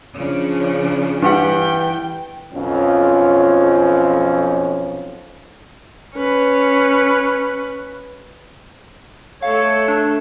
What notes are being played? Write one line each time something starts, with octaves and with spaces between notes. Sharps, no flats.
C#3 F3 D4
G2 E3 G4 F#5 G5
B1 F2 F3 C#4
C#4 B4
A3 A4 C#5 F5
D4